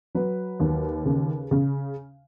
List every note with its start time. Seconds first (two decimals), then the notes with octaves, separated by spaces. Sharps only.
0.15 F#3 B4
0.60 D#2
1.06 C#3
1.51 C#3